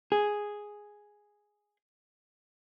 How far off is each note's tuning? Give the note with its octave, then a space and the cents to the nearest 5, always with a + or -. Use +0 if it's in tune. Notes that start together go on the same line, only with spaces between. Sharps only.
G#4 +0